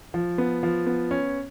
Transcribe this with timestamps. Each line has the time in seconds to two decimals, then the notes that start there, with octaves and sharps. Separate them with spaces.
0.14 F3
0.38 B3
0.63 F3
0.86 B3
1.11 C#4